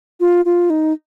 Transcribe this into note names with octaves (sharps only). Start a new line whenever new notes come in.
F4
F4
D#4